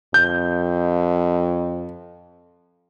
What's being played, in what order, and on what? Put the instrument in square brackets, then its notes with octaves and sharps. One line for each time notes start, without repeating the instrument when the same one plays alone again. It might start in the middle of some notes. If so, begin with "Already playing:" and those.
[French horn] F2 [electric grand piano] G6